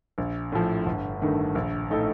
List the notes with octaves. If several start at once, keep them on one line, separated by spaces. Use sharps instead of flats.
A#1
A2 F3
G1
G2 D#3 A3
A#1
A2 A3 D#4 A4